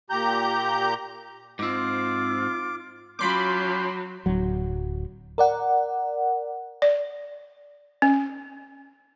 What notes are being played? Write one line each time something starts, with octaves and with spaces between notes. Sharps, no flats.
A#2 G4 A#5 G6
G#2 C4 F4 D6
F#3 C#4 F4 B5 C6 D6 G6
D1 F#3
A#4 D5 F#5
D5
C#4